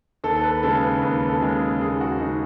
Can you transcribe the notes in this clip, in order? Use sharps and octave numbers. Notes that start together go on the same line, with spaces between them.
D#2 A4
A4
B4
C#3 G#3 A4
B4
D#2 B4
A4
C#3 G#3
G#4
D#2 G#4
F#4
C#3 G#3 D#4